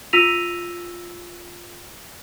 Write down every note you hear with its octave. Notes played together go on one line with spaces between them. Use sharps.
F4 E6 A#6 B6 D#7 F7